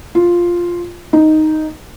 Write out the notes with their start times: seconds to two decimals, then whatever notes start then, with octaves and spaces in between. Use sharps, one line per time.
0.15 F4
1.13 D#4